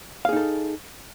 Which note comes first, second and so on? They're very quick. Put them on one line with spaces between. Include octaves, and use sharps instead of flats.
F5 G#4 D#4 A4